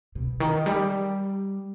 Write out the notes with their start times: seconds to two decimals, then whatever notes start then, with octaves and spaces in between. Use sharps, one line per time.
0.15 B2
0.40 D#3
0.66 G3